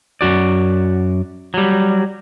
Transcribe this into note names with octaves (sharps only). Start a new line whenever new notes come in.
F#2 F#4 D5
F#3 G3